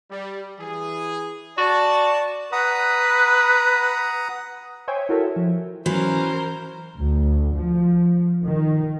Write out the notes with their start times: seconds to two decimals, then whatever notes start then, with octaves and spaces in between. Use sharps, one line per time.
0.11 G3
0.60 E3 G#4
1.58 F#4 D5 A5
2.52 B4 F#5 A#5 D#6
4.88 C5 C#5 E5 G5 G#5
5.09 E4 F#4 A4 A#4 C#5 E5
5.36 F3
5.86 E3 F#3 C#4 A#4 C5
6.96 D2
7.55 F3
8.43 D#3